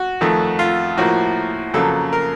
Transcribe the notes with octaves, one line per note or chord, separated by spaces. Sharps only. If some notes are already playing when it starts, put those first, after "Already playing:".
Already playing: F#4
F2 D#3 A3
F4
A2 F3 A#3 F#4
F2 C#3 F#3 A#3 A4
A#4